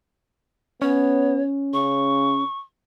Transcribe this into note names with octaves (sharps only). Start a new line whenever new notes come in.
B3 C#4 C#5
C#3 C#6